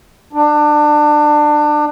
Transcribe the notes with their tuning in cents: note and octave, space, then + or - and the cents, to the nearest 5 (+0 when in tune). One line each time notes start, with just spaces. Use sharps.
D4 +25